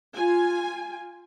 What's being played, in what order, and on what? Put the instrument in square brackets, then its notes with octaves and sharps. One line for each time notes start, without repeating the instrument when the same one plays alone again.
[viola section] F4 G#5